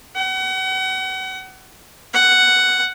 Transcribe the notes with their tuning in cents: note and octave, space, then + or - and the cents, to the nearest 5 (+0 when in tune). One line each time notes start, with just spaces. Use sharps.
F#5 +35
F#5 +5